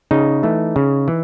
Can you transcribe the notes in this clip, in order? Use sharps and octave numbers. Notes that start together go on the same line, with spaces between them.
C#3 D#4
E3 A3
C#3
E3